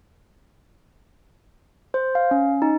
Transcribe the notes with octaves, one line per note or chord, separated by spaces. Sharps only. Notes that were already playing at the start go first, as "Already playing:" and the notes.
C5
F5
C#4
D#4